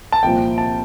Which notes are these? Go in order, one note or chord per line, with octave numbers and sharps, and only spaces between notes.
A5
C2 A#2 F3 G5
A5